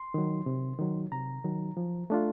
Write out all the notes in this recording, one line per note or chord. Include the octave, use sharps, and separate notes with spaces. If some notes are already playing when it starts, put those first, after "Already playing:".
Already playing: C6
D#3 F#3
C3
D#3 F#3
C3 A#5
D#3 F#3
F3
A3 D4 F4